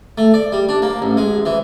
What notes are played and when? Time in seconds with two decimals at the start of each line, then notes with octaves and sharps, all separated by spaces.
0.18 A3
0.34 D5
0.52 G3
0.69 D4
0.82 A#3
1.02 A1
1.17 G#3
1.46 E3